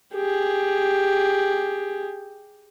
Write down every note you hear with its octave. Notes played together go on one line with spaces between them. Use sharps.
G4 G#4